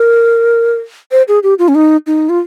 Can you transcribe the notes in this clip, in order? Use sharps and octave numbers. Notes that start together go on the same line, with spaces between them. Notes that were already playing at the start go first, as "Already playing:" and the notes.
Already playing: A#4
C5
G#4
G4
F4
C#4
D#4
D#4
F4